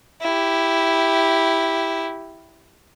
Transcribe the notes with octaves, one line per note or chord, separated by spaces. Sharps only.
E4 G4